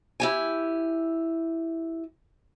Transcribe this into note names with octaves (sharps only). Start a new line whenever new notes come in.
E4 G4 G#5